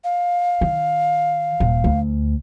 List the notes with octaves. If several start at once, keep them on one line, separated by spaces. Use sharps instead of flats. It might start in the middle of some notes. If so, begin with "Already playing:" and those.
F5
D#3
D#1
D2